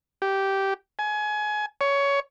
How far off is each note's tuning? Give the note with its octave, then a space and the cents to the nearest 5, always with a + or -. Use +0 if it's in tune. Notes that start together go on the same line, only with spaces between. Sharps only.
G4 -10
G#5 +25
C#5 +15